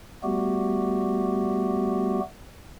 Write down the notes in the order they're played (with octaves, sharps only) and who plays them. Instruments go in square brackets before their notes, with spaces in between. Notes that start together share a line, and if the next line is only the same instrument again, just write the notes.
[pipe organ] G3 A3 B3 F#4 G4